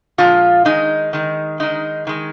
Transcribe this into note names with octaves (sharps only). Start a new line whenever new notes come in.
A#2 F3 G#3 F4
D#3 G#3 D#4
D#3 G#3
D#3 G#3 D#4
D#3 G#3